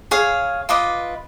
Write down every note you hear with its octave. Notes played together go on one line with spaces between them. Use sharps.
G#4 C#5 F5
F4 B4 D#5 D6